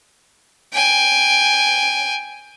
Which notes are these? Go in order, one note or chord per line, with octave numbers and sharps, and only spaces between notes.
G5 G#5